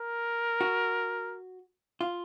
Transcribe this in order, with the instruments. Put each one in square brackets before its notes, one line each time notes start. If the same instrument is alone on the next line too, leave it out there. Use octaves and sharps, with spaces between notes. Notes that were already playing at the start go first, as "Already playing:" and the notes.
Already playing: [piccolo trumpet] A#4
[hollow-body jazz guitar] F#4
F4